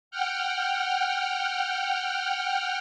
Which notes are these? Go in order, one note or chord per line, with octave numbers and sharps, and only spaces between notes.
F#5 G5 F6